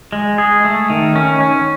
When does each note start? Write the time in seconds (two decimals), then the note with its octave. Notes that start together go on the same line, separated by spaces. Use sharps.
0.12 G#3
0.38 G#4
0.65 A3
0.90 D#3
1.16 C#4
1.41 C#4